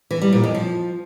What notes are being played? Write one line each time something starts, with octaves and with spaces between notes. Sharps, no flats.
E3
G3
A#2
F2
F3